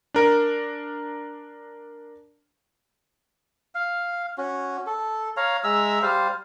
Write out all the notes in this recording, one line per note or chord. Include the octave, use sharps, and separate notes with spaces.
D4 A#4
F5
C#4 F#4
A4
C#5 F5 A#5
G#3 E5 A#5 E6
G3 C5 F5